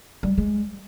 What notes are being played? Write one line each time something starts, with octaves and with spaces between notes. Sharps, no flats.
G3
G#3